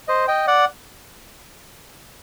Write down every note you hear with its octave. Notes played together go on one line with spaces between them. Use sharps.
C5 D#5
D#5 G5
D5 F#5